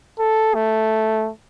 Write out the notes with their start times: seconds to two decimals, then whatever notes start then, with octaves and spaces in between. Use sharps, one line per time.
0.19 A4
0.54 A3